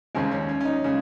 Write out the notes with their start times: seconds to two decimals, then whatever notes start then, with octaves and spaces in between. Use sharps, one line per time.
0.15 D#2 C#3 G#3 C4
0.31 C#4
0.49 C#4
0.60 C#4
0.65 D#4
0.84 C#3 G#3